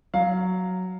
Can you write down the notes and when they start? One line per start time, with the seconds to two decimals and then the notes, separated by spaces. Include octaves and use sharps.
0.14 F#3 F5